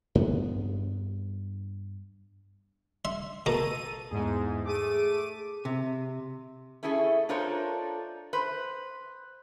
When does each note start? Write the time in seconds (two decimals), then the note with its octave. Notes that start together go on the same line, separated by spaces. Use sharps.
0.15 G2 B3
3.05 E5 C6
3.46 B2 A#3 A4 A#5 D#7
4.11 E2 G#2 G#4
4.65 A3 G#4 D6 D#7
5.65 C3
6.83 A3 C#4 E4 G#4 A4
7.29 D4 F4 A4 A#4 C5 C#5
8.33 B4 C5